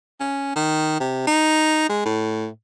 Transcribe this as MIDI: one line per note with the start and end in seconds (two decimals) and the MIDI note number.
0.20 0.53 61
0.56 0.97 51
1.00 1.24 48
1.27 1.87 63
1.89 2.02 56
2.05 2.47 45